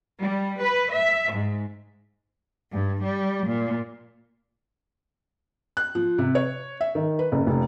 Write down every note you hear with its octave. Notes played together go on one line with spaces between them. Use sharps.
G3
B4
E5
G#2
G2
G3
A#2
F#6
F3
C3
C#5
E5
D#3
B4
F#1
F1